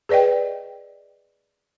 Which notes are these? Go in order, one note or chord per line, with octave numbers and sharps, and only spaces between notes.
G#4 B4 D5 D#5 G5